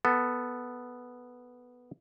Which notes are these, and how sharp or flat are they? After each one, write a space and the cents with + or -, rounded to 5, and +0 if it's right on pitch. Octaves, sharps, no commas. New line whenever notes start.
B3 +0 A4 +0